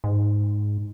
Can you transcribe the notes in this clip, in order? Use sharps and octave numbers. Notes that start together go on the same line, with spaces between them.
G#2